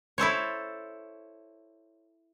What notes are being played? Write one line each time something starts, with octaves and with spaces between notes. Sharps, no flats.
E4 A4 C5 C#5